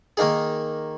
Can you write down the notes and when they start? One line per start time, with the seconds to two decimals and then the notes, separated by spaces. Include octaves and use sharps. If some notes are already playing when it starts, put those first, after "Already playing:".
0.17 D#3 A#3 D#4 G#4